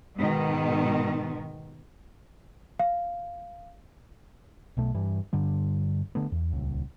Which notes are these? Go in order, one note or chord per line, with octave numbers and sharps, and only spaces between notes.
G#2 B2 D#3
F5
B1 B2 A3
G2 E3
G2 D3 G3
D3 A3 B3
E2
D#1 C#2